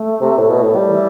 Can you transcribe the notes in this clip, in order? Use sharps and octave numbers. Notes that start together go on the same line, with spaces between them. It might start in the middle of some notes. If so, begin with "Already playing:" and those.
Already playing: A3
C3
A2
B2
A2
G3
E3